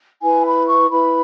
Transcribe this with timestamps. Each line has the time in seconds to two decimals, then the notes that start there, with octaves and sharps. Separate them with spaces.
0.22 E4 B4 G#5
0.44 B5
0.67 C#6
0.90 E4 B4 B5